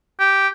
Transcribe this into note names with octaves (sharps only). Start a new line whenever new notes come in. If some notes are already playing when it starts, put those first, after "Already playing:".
G4